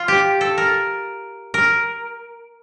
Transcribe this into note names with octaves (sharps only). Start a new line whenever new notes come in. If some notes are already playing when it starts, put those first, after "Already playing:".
Already playing: F4
G4
A4
A#4
A#4